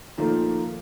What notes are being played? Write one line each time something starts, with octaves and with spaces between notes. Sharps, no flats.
A#2 D#3 F3 A3 A#3